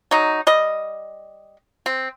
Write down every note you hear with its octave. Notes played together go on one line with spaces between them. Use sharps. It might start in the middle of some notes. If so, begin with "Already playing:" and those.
F#3 D#4
G3 D#5
C4